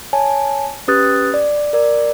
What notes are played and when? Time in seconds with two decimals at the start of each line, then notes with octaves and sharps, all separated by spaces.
0.13 C#5 G#5 A5
0.88 C#4 G4 B4 D#6 F#6 A6
1.34 D5
1.73 A#4 D5